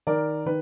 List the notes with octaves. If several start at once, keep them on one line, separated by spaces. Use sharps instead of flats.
D#3 A#4 D5
D#3 B4